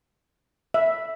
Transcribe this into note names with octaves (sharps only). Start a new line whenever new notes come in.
E5